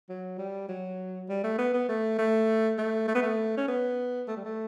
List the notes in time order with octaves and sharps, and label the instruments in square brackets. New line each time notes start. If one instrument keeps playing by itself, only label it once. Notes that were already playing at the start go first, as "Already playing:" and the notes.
[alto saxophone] F#3
G3
F#3
G3
A3
B3
B3
A3
A3
A3
A3
B3
A3
C#4
B3
A3
G3
A3